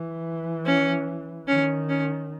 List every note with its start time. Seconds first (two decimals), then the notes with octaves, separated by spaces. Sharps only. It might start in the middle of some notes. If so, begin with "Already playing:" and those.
Already playing: E3
0.66 C#4
1.48 D#3 C#4
1.89 C#4